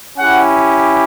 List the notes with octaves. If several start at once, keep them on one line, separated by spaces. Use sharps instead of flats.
C#4 E4 G4 F#5